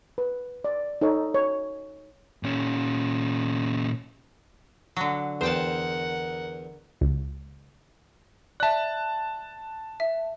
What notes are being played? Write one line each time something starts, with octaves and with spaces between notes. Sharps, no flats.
B4
D5
D#4 A4 C#5
C#5
A#2 C#4
D3 F#3
E2 A#4 C5 F#5 G5 A5
C#2
D5 E5 A5 F#6
E5